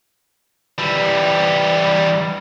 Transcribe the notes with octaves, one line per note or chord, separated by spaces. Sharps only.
E3 G3